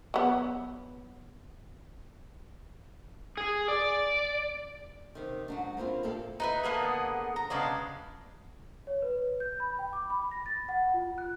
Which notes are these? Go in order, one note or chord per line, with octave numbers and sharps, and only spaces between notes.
F#3 B3
G#4
D5
C3 D#3
G#2 F#3 D4
A#3 C4 E4 F4
A#2 A#3 G4 A4 D5
D#4 B4 E5
D3 A#3 B3 G#4
A#5
C#3 G#3 B3 D4
C#5
B4
G6
B5
G5
D6
B5
A#6
A6
F#5
F4
F#6